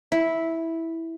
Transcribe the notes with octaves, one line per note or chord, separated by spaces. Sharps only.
E4